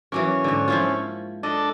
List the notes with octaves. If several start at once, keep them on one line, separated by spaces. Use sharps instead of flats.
E3 F#3 A#3 C#4
G#2 D3
F3 E4 F4
D4 A4 D#5